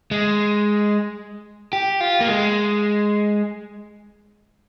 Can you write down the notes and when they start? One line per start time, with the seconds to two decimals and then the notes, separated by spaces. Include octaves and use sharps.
0.11 G#3
1.73 G4
2.01 F4
2.21 A#3
2.28 G#3